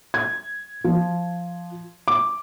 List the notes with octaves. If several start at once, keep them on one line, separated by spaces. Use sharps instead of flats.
G#6
F3
D6